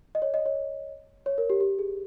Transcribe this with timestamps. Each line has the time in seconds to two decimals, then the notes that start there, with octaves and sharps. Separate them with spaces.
0.15 D#5
0.22 C#5
0.34 D#5
0.46 C#5
1.26 C#5
1.38 A#4
1.50 G4
1.61 G4
1.79 G#4